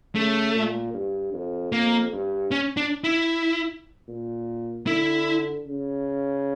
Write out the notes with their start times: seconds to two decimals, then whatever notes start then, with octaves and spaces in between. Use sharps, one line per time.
0.15 C#3 A3
0.55 A#2
0.94 G2
1.33 F2
1.72 F2 A#3
2.12 G2
2.51 C#4
2.77 D4
3.04 E4
4.08 A#2
4.87 D3 E4
5.66 C#3